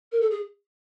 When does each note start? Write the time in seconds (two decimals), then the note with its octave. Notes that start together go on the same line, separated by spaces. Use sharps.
0.12 A#4
0.21 A4
0.31 G#4